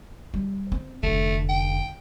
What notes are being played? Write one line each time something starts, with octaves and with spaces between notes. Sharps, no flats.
G3
C4
F1 D3 A3
G5